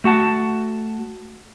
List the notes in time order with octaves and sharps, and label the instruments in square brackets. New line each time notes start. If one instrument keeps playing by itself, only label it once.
[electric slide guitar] A3 F#4 F#5 A5